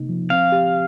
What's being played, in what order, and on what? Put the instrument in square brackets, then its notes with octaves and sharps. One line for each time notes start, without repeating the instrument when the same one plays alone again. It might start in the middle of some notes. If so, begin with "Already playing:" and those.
Already playing: [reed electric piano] C3 A#3 D#4
F3
[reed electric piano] C4 [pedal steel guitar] F5
[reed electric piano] G4